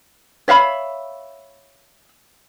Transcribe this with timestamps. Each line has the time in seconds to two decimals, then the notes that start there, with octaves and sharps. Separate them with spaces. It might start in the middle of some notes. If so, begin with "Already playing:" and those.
0.48 C#5 E5 F5 B5